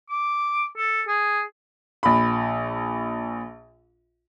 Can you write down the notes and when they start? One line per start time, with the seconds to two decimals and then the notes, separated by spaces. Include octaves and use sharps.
0.09 D6
0.77 A4
1.08 G#4
2.03 A#1 B5